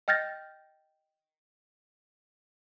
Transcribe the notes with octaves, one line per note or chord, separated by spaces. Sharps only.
D#5 G5 F6 G6 A6 A#6